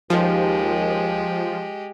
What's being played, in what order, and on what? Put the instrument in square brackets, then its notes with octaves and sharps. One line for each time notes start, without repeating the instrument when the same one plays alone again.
[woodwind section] D#2 [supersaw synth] F3 [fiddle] G#3 G4